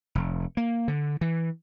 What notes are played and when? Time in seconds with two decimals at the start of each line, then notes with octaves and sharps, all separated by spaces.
0.15 F1
0.57 A#3
0.88 D3
1.21 E3